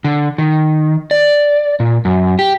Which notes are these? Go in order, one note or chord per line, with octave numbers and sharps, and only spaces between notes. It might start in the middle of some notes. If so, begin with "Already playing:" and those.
D3
D#3
D5
A#2
F#2
G4